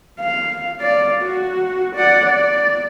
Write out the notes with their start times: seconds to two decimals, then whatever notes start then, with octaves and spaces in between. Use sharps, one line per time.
0.20 F5
0.81 D5 F5
1.22 F#4
1.96 D5 F#5
2.26 D5